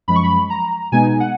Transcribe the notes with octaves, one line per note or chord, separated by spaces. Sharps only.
F#2 F3 G#3 B5
C#6
B5
A#5
B2 G#3 B3 D#4 G#5
F#5